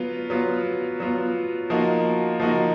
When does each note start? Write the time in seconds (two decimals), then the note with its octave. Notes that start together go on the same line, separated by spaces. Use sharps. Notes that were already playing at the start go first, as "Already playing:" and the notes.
Already playing: F#3 B3 F4
0.30 F#3 B3 F4
1.00 F#3 B3 F4
1.70 F3 A#3 D#4 F#4
2.40 F3 A#3 D#4 F#4